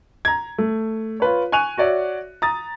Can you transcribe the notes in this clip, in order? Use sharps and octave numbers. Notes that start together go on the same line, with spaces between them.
A#5 G#6
A3
F4 B4 C#5
G#5 C#6 F#6 D#7 F7
F#4 C#5 D5 E5
A#5 D#6 A6